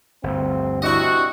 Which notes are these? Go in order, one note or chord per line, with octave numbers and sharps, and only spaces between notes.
G1 D2 C4
C3 D4 E4 F#4 D#5